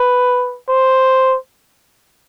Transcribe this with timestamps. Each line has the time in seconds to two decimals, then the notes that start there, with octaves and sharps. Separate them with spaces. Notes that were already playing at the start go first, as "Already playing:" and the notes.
Already playing: B4
0.69 C5